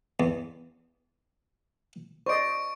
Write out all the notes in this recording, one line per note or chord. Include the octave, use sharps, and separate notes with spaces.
E2
C5 D5 D#5 C#6 D7